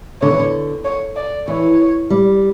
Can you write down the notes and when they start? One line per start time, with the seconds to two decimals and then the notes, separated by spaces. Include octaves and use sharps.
0.22 D3 C#5
0.31 E3
0.39 D3
0.85 C#5
1.16 D5
1.48 E3 C#5
2.10 G3